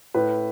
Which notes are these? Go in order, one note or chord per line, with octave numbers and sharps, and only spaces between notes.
A2 B4